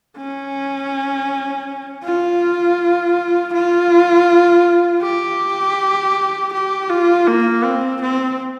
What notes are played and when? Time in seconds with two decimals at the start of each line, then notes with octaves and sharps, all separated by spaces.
0.18 C#4
2.04 F4
3.53 F4
5.03 G4
6.53 G4
6.90 F4
7.27 A#3
7.64 C4
8.01 C4